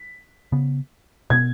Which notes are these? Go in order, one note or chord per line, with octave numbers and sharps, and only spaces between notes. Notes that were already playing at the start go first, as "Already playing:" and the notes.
Already playing: B6
C#3 B3
B2 B3 G#6